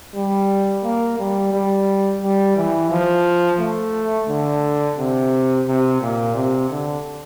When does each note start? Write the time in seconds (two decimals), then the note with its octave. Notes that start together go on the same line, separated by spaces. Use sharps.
0.15 G3
0.84 A#3
1.19 G3
1.53 G3
2.22 G3
2.56 E3
2.91 F3
3.60 A3
4.29 D3
4.98 C3
5.67 C3
6.02 A#2
6.35 C3
6.70 D3